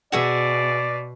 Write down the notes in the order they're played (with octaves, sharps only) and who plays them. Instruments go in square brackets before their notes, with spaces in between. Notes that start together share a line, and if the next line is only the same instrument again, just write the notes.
[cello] B2 [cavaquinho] F#4 G#4 E5 [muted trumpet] D5